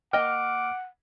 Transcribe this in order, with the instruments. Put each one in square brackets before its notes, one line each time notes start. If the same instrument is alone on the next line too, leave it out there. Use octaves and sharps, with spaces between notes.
[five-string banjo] A#3 D#5 G5 [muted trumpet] F#5 [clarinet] D6 [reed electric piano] F6